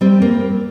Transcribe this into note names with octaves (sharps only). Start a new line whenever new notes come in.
G3 C4
A#3